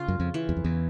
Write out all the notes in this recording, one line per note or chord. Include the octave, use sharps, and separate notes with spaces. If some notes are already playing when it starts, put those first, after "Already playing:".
Already playing: C#3 F4
F#2
F2
E3
E2
F2
E2